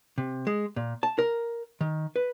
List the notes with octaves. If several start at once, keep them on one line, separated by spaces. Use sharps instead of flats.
C3
G#3
A#2
A5
A#4
D#3
B4